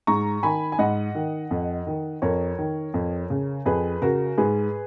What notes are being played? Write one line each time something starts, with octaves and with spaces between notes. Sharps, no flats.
G#2 A#5 C#6
D#3 G#5 B5
G#5
G#2 D#5 F#5
D#3
F2
D#3
F2 A#4 C#5
D#3
F2
C#3
F2 G#4 B4
C#3 F#4 A#4
G#2 G#4 B4